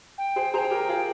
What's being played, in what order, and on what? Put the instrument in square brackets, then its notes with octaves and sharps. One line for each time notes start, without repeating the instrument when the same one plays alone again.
[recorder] G5
[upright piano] G#4 C5
[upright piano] G#4 C5 [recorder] G5 A#5
[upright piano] G#4
G4 A#4
F4 G#4